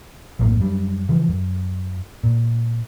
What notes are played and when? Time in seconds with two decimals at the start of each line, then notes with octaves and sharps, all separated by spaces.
0.39 A#1 F#2 A2 A#3
0.60 F#2 G3
1.09 C#3 E3 F3
1.29 F#2
2.24 A#2